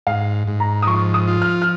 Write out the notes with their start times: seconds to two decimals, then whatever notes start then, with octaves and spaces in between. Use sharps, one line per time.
0.07 G#2 F5
0.47 G#2
0.60 A#5
0.83 D#6
0.87 F3 C#6
1.14 D#6
1.28 F4
1.42 F6
1.62 F6